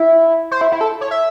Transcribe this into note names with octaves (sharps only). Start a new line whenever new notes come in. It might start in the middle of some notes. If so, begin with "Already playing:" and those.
Already playing: E4
C5
E4
E4
A4
C#5
E5